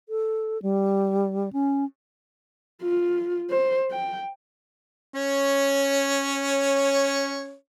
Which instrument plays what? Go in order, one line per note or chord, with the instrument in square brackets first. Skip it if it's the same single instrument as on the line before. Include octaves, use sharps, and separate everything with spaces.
[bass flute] A4
G3
C#4
[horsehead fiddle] F4
C5
G5
[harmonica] C#4 C#5